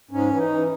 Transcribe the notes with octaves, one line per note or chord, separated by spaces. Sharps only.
G#2 C#4
E3
D#4
E3